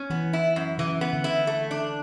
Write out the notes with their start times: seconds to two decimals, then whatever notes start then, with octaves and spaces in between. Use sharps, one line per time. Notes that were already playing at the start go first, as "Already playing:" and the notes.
Already playing: C#4
0.10 E3 B3
0.33 E4
0.56 F#2
0.78 C#3 E3
1.01 B3
1.13 D3
1.24 E4
1.47 A3
1.71 D4